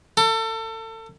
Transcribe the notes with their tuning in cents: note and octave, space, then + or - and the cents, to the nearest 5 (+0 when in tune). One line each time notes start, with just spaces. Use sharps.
A4 +30